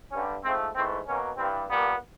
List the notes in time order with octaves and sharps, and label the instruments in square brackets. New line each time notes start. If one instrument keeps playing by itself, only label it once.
[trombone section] G2 D3 G3 C#4
G#2 F3 A3 C4
G#2 E3 A3 C4
B2 F#3 A#3 C#4
G2 E3 G3 C4
A#2 G3 A#3 B3